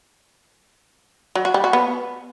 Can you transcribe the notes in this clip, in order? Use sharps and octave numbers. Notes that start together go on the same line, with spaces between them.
F#3
F#4
G3
F#4
B3